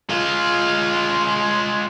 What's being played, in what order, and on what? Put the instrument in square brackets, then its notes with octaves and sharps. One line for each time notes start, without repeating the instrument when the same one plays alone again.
[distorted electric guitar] G#3 F4